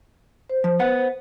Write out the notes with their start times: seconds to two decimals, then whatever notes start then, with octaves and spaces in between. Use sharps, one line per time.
0.49 C5
0.64 F3
0.79 B3 F#5